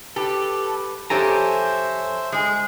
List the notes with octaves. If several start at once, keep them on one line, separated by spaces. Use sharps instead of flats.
G4 A4 B4
F2 G4 A4 C5 C#5 E5 G#5 A#5
G#3 G#4